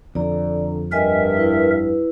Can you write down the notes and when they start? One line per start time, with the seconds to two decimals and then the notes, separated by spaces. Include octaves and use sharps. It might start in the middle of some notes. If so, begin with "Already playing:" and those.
0.15 F2 D3 D5 A#5
0.92 G2 A#4 D#5 E5 G5 G#5
1.37 E4 B4